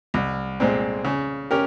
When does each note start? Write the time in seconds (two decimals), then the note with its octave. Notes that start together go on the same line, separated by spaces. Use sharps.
0.14 C2
0.60 A#2 G#3 C4
1.05 C#3
1.51 C#4 G4 A#4